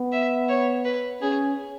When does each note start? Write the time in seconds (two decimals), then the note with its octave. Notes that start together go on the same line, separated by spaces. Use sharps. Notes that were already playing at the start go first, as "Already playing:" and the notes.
Already playing: B3
0.12 E5
0.49 C#5
0.85 B4
1.22 C#4 G#4